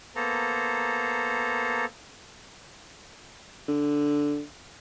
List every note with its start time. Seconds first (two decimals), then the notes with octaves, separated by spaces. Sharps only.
0.16 A#3 B3 A4 C5 A#5
3.68 D3